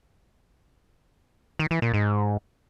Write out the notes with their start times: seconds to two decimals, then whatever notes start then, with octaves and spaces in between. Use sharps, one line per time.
1.59 D#3
1.71 E3
1.82 A#2
1.94 G#2